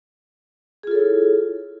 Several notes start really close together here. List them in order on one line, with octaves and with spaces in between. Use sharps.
G#4 F4 A4 C#5 E4